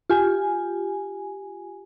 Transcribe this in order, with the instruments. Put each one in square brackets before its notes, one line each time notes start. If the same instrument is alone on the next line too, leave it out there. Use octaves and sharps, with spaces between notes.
[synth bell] F4 G4 G#5